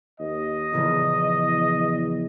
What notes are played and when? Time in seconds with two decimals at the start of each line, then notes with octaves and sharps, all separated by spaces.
0.19 D#2 D#5
0.73 E2 A#2 C#3 F3